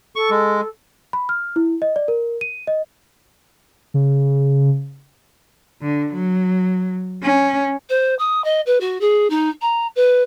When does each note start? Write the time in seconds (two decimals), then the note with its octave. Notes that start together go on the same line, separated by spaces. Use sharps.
0.16 A4 C#6
0.30 G#3
1.13 B5
1.29 F6
1.56 E4
1.82 D#5
1.96 D5
2.08 A#4
2.41 D#7
2.67 D#5
3.94 C#3
5.82 D3
6.13 F#3
7.22 C#4
7.89 C5
8.19 D#6
8.44 D#5
8.66 B4
8.80 F#4
9.01 G#4
9.30 D#4
9.61 A#5
9.96 B4